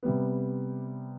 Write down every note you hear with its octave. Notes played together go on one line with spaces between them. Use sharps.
C3 G3 B3